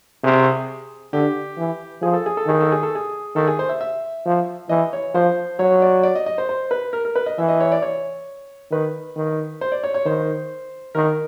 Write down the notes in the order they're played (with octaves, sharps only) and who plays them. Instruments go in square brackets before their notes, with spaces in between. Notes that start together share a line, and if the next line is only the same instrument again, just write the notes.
[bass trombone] C3 [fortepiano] G#4
[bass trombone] D3 [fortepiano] G4
[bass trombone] E3
[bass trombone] F3 [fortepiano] G#4
[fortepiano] A4
G#4
A4
[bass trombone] D#3 [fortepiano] G#4
[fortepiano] A4
G#4
A4
G#4
[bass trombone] D#3 [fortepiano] A4
[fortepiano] G#4
C5
E5
E5
[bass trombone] F3
[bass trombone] E3 [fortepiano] D#5
[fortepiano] C#5
[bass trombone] F3 [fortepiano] C5
[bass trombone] F#3 [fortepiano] C#5
[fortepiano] D5
D5
D#5
D#5
C5
C5
B4
A#4
A#4
B4
D#5
[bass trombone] E3 [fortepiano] E5
[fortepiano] D#5
C#5
D5
C#5
[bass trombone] D#3 [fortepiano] B4
[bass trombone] D#3
[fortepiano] C5
D5
C#5
C#5
[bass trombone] D#3 [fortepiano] C5
[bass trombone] D#3 [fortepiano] A#4